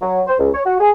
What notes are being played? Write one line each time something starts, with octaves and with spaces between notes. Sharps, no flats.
F#3
C5
C#2
C#5
F#4
G#4